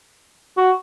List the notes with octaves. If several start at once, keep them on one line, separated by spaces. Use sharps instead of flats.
F#4